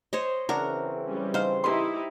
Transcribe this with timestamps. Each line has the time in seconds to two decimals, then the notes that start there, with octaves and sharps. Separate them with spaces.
0.13 C5 C#5 D#5
0.49 C#3 E3 F#3 C4 D4 F#4 A#4
1.05 G3 C#4
1.34 D#4 C5 F5
1.64 D#4 E4 G4 B4 C6